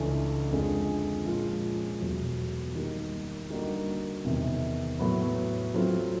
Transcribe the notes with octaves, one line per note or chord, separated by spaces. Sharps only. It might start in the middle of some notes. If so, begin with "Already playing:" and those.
Already playing: C#2 C#3 E3 A3 D4
F2 D3 F3 G#3
A#2 F3 G#3 C#4 F4
E2 B2 F#3 A3
D#3 G3 A#3 D#4 G4
D3 G3 A#3 D#4 F#4
E2 C3 D#3
A2 F#3 B3
F#3 A3 C4 F4